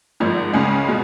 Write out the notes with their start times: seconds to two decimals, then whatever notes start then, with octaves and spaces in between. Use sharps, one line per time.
0.20 G#1 G#2 F3
0.53 C#2 C#3 G#3 C#4
0.88 B2